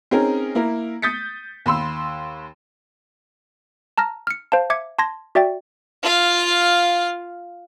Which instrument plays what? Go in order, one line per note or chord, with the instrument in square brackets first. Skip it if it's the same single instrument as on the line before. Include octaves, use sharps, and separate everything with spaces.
[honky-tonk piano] C4 C#4 D#4 G#4 A#4
A#3 E4 A#4
D#6 G6 A6 B6 C#7
D#2 B5 C6 E6
[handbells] A5 A#5 F6 A#6
F6 C#7
C5 F5 A5
E5 D6 G#6 C#7
A5 C6 G#6 A#6
F#4 D5 E5 G5 A6
[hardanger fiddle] F4 F5